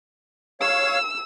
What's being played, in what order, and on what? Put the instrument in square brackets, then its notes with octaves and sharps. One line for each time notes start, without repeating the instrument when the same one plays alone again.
[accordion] C#5 F5 [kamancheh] E6